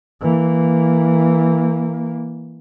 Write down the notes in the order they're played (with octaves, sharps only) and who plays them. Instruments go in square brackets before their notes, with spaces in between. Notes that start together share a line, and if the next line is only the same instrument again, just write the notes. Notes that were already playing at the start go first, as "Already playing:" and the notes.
[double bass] E3 A#3